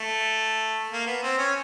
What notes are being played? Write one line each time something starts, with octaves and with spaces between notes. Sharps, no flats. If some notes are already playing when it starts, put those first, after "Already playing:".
Already playing: A3
A#3
B3
C4
C#4